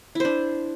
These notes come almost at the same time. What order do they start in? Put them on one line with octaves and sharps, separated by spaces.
E4 C5 D4